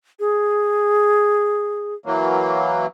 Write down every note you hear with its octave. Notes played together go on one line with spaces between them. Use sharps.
G#4
E3 F#3 A#3